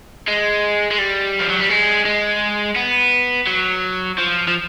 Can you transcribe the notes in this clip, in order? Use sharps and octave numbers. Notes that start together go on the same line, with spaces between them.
G#3
G#3
G3
F3
F#3
G3
G#3
G#3
B3
F#3
F3
F3